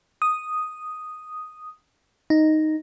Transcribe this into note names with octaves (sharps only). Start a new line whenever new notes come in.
D#6
D#4